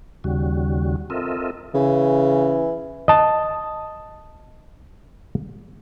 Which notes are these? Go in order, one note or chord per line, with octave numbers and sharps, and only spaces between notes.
D#2 C#3 G3 F#4
C4 F4 A4 A#4 D#5 E5
C#3 E3
D#5 A5